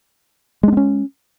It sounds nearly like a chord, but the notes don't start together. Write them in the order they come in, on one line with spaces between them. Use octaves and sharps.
G#3 D4 B3 C#4